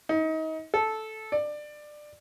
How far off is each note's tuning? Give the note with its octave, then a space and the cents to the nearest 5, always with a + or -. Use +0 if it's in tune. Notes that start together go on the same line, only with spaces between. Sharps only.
D#4 +30
A4 -10
D5 +20